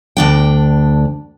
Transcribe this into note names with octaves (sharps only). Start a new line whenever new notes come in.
D2 D4 G5